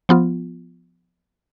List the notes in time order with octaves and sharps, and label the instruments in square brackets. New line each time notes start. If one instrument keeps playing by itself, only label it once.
[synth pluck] F3 B3 F4